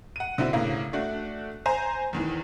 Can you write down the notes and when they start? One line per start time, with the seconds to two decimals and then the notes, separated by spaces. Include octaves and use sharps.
0.16 F#5 D#7
0.38 D3 C4 E4 F#4
0.53 A2 C#3 A#3
0.93 A3 D4 F#4
1.66 C5 G#5 A#5
2.13 E2 D#3 E3